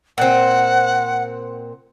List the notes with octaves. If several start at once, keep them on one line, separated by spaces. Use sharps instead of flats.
A#2 C4 F#5